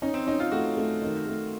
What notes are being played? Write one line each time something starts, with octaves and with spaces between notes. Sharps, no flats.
C#4 D#4
C4
C#4 D#4
F4
A3 F#4
A3
D#3
A3